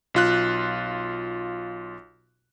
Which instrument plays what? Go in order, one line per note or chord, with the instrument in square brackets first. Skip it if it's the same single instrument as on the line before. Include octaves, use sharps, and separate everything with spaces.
[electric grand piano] B1 F4 F#6